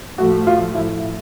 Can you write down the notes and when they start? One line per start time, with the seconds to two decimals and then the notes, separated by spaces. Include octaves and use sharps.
0.18 A2 F3 A3 F#4
0.47 F4
0.75 E4